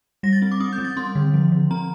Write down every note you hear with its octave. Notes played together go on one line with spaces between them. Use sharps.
G3 A#6
A6
C4
D6
C4 D#6
G6
G3
A6
C4 C6
D3
F3
D3
C4 A#5